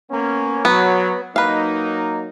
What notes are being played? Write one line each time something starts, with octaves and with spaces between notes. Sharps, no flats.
A#3 B3 C#4
F#3 B3
F#3 A#3 D#4 B4 F5